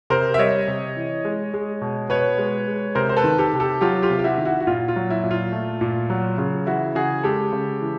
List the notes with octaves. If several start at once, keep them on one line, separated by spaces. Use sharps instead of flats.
C3 A#4 C5
E5
G3 C#5 D#5
C3
E3
G#3
G#3
B2
B2 B4 C#5
G#3
G#3
C3 A#4 C5
C5
A4 B4
D#3
G4 A4
C3
G4 A4
F#3 F4 G4
F4 G4
C3
G4
E4 F#4
D#3
E4 F#4
F#4
A#2 F4
F4
F#3
E4
A#2
F4
A3
A#2
F#3
C#3 F4
E3 E4 F#4
C#3 F#4 G#4
G#3 G4 A4
C#3
E3